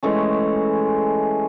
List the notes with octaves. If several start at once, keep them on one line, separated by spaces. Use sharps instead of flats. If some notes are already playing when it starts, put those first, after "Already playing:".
E3 G#3 A3 C#4